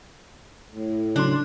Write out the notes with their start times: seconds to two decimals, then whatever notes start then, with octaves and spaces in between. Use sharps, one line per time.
0.72 A2
1.16 C#3 F#3 D4 C6